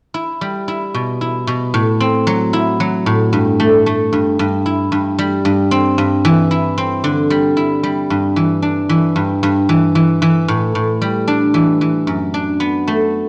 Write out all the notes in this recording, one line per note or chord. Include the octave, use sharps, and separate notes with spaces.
E4
G3
E4
B2
E4
B2
A2
C4
F#3
E4
F#3
A2
G2
A3
A3
G2
G2
E4
G2
G3
G2
C4
G2
E3
E4
C4
D3
G3
E4
G3
G2
E3
D4
E3
G2
G2
E3
E3
E3
A2
A2
G3
D4
E3
E3
F#2
D4
B3
A3